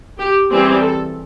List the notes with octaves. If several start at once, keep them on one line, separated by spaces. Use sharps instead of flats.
G4
E3 G3 C4 G#4
A4